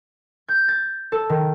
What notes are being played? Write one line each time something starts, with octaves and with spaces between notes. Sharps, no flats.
G6
A6
A4
D#3